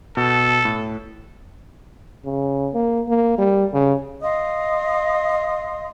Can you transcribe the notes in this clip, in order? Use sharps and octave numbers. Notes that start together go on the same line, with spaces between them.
B2 A4
A2
C#3
A#3
A#3
G3
C#3
D#5 F5 C6 D#6